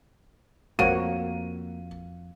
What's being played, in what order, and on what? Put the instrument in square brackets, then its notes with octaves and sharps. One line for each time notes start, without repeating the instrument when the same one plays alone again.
[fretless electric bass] F2 [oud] A#3 [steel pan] F#4 C#5 [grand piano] D#7